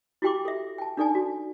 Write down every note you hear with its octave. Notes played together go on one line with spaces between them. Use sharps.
E4 F#4 G4 G5 C6 D6
A4 E5
G5 A5
D4 D#4 A4 D5 G#5 A5
F#4